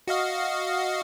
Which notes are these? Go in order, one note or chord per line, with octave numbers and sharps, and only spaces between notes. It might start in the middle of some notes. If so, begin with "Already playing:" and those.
F#4 D#5 F5